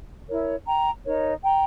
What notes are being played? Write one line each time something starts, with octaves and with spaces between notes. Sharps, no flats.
E4 A#4 C#5
G5 A#5
D#4 A#4 C#5
G5 A#5